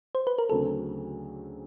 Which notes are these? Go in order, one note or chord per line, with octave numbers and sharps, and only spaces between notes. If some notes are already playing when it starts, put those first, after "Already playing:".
C5
B4
A#4
D2 C#3 F#3 A3 C4 A4